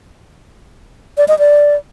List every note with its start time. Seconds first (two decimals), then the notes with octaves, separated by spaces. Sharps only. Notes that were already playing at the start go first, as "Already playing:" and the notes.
1.18 D5
1.28 D#5
1.39 D5